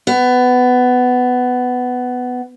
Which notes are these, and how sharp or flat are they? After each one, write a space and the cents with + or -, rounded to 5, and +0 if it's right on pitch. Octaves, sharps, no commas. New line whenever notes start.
B3 +15